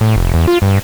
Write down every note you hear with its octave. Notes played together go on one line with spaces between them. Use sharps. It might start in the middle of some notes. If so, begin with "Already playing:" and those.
A2
F1
E2
F4
G2